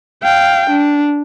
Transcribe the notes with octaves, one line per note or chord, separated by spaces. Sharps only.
F5 G5
D4